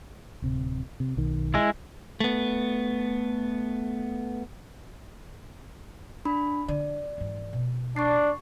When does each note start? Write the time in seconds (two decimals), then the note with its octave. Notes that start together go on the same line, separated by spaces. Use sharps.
0.42 D1 C3
1.00 C3
1.17 B1 D#3
1.54 G#3 E4
2.20 A3 B3
6.25 D4 B5
6.68 D3 D5
7.18 G#2 E3
7.53 B2
7.96 D4 C#6 A6 C7